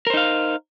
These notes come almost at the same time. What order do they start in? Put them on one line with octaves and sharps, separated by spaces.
A#4 C5 D#4 F5